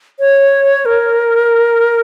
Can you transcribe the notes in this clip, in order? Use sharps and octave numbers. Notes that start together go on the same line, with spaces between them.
C#5
A#4